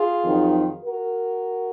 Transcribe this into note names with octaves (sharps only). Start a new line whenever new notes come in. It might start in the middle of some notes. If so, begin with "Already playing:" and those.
Already playing: F4 G#4
F2 D#3 F#3
F#4 A#4